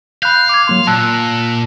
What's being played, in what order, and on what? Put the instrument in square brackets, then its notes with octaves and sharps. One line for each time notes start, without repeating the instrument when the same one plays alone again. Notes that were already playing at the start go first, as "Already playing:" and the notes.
[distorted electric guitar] F5 [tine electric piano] B5 F#6 G6
[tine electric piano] D6 G#6
F#3 A#3 C6
[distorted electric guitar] A#2 [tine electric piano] A5 E6 F#6